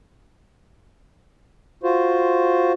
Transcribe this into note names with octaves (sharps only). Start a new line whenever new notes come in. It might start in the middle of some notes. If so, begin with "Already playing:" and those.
F4 F#4 C5